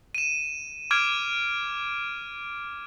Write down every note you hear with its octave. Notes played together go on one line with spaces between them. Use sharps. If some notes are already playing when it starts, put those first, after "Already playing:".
D#7 E7
D6 F6 G#6 D7 E7